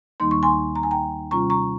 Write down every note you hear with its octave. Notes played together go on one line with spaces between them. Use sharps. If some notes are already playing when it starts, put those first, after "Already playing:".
D#2 D#3 G3 A#3 D#4 C6
C#6
G#5 C6
A#5
G#5
G5 A#5
C3 G3 C#4 F4 A#5 C#6
A#5 C#6